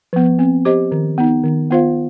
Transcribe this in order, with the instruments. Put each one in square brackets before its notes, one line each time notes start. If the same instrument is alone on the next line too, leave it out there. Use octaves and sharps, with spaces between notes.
[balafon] F3 B3
C4
G4 C5 D#5
D#3
B3 D#4
D#3
B3 F4 C5 F5